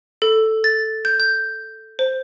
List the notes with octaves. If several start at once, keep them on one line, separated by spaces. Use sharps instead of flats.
A4
A6
G6
G6
C5